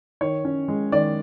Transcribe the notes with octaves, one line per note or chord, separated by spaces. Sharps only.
D#3 C#5
C#4
G#3
D#3 D5